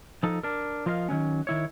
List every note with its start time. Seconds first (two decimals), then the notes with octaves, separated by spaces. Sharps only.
0.23 F3 D#4 A4
0.43 D4 A#4
0.86 F3 F4 A#4 D#5 F5
1.09 D#3 F3 F#3 C#4
1.47 D#3 E4 C#5